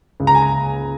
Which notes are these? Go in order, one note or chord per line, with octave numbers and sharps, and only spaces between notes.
C#2
A#5
G#5
A#5